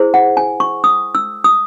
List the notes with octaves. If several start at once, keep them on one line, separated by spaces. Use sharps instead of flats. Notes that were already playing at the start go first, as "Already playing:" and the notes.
Already playing: E4 G#4 C5
F#5
G#5
C#6
D#6
E6
D#6